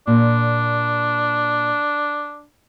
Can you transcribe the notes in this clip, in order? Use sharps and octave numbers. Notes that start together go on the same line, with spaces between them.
A#2 D4